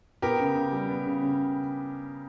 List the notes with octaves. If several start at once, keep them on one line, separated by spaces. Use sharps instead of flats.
B3 G4 A#4
C#3
C#3
G3
B3
C#3
C#3